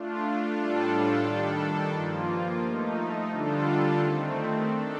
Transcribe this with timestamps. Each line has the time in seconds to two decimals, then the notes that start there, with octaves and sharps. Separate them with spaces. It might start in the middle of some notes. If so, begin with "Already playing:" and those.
Already playing: A3 D4 F4
0.55 A2 G3 D4 F4 A4
1.24 D#3 G3 D4 A4
1.92 G2 F3 A#3 F4
2.61 F3 A3 D#4
3.30 D3 G3 D4 F4 A4
3.99 D#3 A3 C4
4.67 D4 A4